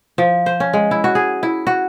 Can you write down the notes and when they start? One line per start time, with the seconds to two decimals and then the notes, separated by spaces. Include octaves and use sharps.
0.18 F3
0.46 C5
0.60 C#4
0.73 G#3
0.91 E4
1.04 F#4
1.15 G#4
1.43 E4
1.67 F#4